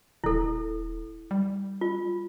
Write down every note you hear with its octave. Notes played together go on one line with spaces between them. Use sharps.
D#1 E4 A4
G3
F4